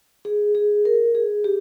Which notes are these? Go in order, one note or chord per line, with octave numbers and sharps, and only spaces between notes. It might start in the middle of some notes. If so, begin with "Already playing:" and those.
G#4
G#4
A#4
G#4
G4